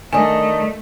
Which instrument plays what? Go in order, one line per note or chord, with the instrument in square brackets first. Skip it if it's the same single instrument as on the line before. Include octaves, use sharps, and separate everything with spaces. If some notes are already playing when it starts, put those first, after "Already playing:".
[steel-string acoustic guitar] D#3 D4 [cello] A3 [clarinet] D#5 [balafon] G#5